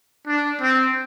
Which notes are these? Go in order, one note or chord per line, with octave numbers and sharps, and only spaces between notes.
D4
C4